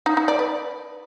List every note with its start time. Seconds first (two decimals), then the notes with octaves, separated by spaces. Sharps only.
0.06 D#4
0.17 D#4
0.28 D5
0.39 B4